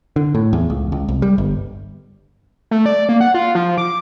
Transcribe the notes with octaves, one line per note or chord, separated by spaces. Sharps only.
D3
A2
E2
C#2
C#2
C2
G3
G1
A3
D5
A#3
F#5
F4
F3
D6